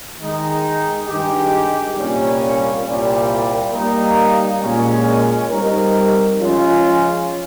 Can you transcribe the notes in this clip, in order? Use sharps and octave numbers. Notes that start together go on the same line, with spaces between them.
D#3 G#3 D#4
G2 D#3 G#3 D#4 G4
C2 A#2 G3 A#3 C#4
C2 A#2 G3
G3 A#3 D#4
A#2 G#3 C#4
G3 C4 D#4 A#4
F3 G#3 C#4 F4